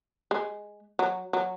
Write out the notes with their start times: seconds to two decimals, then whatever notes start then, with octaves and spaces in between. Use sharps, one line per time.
0.31 G#3
0.99 F#3
1.33 F#3